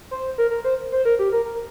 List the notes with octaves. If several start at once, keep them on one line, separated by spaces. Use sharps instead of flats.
C5
A#4
A#4
C5
C5
A#4
G4
A#4
A#4